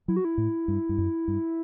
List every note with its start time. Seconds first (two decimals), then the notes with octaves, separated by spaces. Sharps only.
0.08 F#3 E4
0.16 F#4
0.25 E4
0.38 A2
0.68 G2
0.89 G2
0.98 F#2
1.28 G2